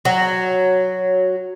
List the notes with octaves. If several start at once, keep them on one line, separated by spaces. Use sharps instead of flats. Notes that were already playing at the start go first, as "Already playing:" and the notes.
F#3